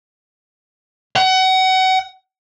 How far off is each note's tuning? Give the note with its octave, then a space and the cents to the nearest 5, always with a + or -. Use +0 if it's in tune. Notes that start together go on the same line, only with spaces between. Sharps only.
F#5 +30